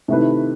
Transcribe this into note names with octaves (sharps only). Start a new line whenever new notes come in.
C3 D#3 A3 E4 B4